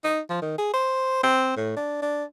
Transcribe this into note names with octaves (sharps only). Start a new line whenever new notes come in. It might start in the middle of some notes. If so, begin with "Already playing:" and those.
D#4
F3
D#3
G#4
C5
C4
A2
D4
D4